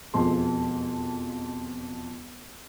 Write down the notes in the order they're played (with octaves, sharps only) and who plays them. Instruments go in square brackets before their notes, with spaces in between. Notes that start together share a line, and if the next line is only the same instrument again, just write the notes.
[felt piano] E1 F2 F3 G#3 C6